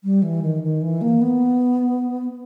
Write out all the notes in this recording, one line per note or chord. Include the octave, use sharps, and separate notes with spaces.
G3
E3
D#3
D#3
E3
A#3
B3